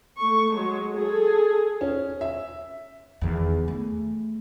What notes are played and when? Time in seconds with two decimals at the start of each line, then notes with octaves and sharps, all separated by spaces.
0.18 A3 C#6
0.52 F#3 G#3
0.97 G#4 A4
1.81 C#4
2.21 E5
3.21 E2 D#3
3.68 A3